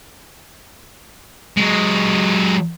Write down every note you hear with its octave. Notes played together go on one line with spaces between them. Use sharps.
F#3 G#3